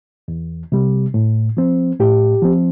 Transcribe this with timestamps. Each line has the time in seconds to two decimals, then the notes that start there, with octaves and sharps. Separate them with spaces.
0.28 E2
0.72 C3 G3
1.14 A2
1.57 F3 C4
1.99 A2 G4
2.42 F3 C4